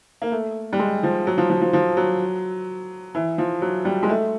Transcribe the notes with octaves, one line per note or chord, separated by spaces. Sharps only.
A#3
A3
G3
G#3
F3
F#3
F3
F3
F3
F3
F#3
E3
F3
F#3
G3
G#3
A3